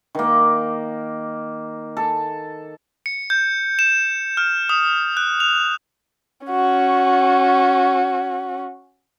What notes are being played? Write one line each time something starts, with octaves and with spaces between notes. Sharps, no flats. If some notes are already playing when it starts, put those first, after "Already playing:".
D#3 A#3
A4
C#7
G6
E7
F6
D#6
F#6
F7
C#4 F#4